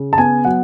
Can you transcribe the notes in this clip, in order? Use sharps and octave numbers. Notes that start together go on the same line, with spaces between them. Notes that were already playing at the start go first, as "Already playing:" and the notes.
Already playing: C#3
A5
B3 G#5
F#3 F#5